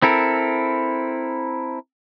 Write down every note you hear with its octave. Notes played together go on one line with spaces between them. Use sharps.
C4 E4 A4 A#4